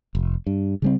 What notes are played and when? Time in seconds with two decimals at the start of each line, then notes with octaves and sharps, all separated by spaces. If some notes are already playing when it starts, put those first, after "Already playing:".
0.15 F1
0.47 G2
0.82 C#3 G3 C4